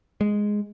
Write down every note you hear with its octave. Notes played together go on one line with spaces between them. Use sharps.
G#3